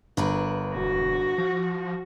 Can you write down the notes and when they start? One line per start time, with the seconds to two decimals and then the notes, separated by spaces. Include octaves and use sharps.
0.17 G1 D4 A#4 B4
0.75 E1 F#4
1.38 F3